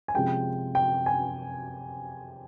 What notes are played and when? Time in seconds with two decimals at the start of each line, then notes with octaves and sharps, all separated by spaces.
0.08 G#5
0.14 C3 F3 G#3 C#4 G5
0.75 G5
1.06 G#5